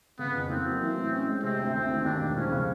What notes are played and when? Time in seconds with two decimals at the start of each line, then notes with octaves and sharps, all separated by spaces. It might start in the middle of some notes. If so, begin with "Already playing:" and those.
0.19 C#3 B3
0.35 F2
0.49 A#3 C4
0.65 F#3
0.81 E3
0.96 A2
1.12 C#4
1.27 G#3
1.43 C3 C4
1.59 D2
1.74 D2 C4
1.89 D#3
2.04 D#2 D4
2.20 E1
2.35 F3 C#4
2.52 C#3